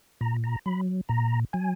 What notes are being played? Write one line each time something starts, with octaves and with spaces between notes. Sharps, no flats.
A#2 A#5
A#5
F#3 B5
A#2 A#5
F#3 G#5